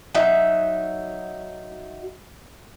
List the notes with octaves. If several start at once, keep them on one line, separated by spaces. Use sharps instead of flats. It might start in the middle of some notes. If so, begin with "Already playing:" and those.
F#3 D#4 E5